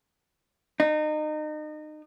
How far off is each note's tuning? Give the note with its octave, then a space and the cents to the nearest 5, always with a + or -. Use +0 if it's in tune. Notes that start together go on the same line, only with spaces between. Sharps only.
D#4 -30